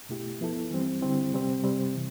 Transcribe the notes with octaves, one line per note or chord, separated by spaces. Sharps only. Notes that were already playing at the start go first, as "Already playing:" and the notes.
B2 A3 E4 G4
F3 B3 E4 A4
E3 G3 C4
D3 G3 C4 E4
C3 G3 C4
C3 G3 C4
C3 E3